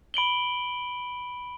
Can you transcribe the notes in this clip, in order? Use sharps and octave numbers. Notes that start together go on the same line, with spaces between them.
B5 D7 F#7 G7